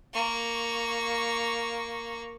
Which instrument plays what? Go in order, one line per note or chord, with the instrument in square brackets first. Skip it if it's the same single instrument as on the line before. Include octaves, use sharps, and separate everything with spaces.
[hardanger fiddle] A#3 C#6